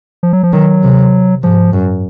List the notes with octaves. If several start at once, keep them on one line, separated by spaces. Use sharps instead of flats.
F3
F#3
F3
D#3 F#3
C3
G#2 F3
F#2